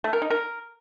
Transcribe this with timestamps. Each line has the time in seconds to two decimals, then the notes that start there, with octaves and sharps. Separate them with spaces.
0.04 A3
0.13 A#4
0.22 D#4
0.30 A#4